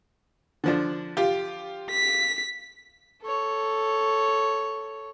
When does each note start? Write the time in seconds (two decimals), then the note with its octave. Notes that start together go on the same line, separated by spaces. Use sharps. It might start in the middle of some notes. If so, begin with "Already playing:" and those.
0.64 D3 F3 D4
1.17 F4 G4
1.91 B6
3.22 A4 C#5